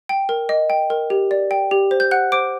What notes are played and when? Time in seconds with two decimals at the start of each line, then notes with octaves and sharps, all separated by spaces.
0.09 G5
0.29 A#4
0.49 D#5
0.70 G5
0.90 A#4
1.10 G4
1.31 D5
1.51 G5
1.71 G4
1.91 C5
2.00 G6
2.11 F#5 F#6
2.32 C5 D6 D7